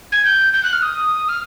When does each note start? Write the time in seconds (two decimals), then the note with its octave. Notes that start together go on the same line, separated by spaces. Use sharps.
0.12 G#6
0.25 G6
0.53 G6
0.63 F#6
0.73 F6
0.82 D#6
1.29 F6